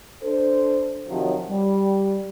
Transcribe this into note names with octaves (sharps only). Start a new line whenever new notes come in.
D4 A4 C5
C3 D#3 F3 F#3
G3